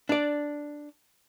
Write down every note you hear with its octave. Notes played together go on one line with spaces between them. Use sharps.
D4 D5